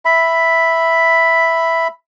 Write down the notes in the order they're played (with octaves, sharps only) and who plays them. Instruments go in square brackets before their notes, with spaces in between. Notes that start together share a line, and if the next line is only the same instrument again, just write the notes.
[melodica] E5 B5